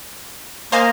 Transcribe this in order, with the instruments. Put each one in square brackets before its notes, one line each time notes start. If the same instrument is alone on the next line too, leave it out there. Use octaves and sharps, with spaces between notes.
[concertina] A#3 D#5 A#5 [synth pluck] C5 F5 G#5